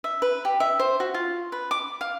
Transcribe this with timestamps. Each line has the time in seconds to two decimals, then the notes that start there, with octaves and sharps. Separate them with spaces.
0.04 E5
0.22 B4
0.45 G4
0.60 E5
0.79 C5
1.00 F#4
1.14 F4
1.52 B4
1.71 D6
2.01 F5